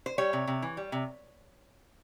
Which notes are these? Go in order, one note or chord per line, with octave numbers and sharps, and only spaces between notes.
C5
G3 C#5
C3
C3
E3
G3
C3